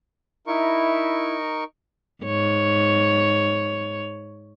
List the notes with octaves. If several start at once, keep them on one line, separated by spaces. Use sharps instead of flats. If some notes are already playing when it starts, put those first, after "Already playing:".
D#4 E4 A#4 C#6
G#2 C#5